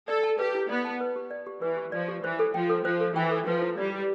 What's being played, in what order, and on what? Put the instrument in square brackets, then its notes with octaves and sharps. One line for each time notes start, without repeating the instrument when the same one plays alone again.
[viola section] A4 [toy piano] D5
[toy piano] A5
[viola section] G4 [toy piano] B4
[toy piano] E4
[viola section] B3 [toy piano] D5
[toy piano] A5
B4
G4
D5
G4
[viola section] E3 [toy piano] B4
[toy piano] G4
[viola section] F3 [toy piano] D5
[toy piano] G4
[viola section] E3 [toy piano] C5
[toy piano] A4
[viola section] F3 [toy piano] G5
[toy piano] A4
[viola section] F3 [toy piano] C5
[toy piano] A4
[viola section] E3 [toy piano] G5
[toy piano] A4
[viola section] F3 [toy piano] B4
[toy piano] E4
[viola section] G3 [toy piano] D5
[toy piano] E4